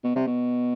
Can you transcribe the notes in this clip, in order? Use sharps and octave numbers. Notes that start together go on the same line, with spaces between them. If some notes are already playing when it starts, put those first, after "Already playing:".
B2
C3
B2